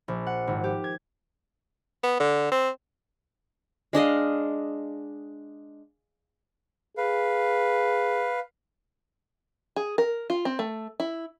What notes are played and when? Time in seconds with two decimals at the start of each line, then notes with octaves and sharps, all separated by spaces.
0.08 A#1
0.26 F#5
0.47 G#1
0.64 G4
0.84 G#6
2.03 B3
2.20 D3
2.52 C4
3.93 G#3 D4 D#5 F5
6.97 G#4 B4 F5
9.76 G#4
9.98 A#4
10.30 F4
10.45 C4
10.59 A3
11.00 E4